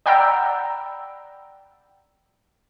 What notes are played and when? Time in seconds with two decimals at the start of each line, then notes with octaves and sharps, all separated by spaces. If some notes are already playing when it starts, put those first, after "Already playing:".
0.06 D5 F#5 G5 A#5 B5 E6